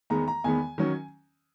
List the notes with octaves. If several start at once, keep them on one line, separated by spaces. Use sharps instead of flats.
E2 D#3 G#3 B3 A#5
A#5
E2 D#3 G#3 B3 G#5
D#3 F#3 C#4